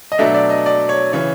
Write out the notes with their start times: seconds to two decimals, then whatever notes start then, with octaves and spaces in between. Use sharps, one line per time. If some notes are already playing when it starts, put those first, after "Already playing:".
0.12 D#5
0.18 B2 F#3 A3 D4 E5
0.34 D5
0.50 D#5
0.66 D5
0.89 C#5
1.13 C#3 E3 C#5